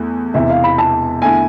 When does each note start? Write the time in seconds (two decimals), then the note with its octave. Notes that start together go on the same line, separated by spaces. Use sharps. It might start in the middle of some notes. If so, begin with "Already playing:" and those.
Already playing: E2 A3
0.34 E1 E2 C3 E3 E5
0.49 F5
0.64 B5
0.78 A5
1.21 E2 D3 A3 E4 G#5